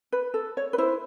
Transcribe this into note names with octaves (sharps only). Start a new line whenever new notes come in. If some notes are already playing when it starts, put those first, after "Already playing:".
B4
A4
C#5
B4
E4 C5